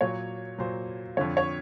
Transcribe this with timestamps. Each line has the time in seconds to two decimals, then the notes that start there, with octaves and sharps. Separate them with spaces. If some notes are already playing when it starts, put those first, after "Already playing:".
0.01 A#2 F#3 C#5
0.58 A#2 F#3 C5
1.17 F2 D3 F3 C#5
1.37 C#5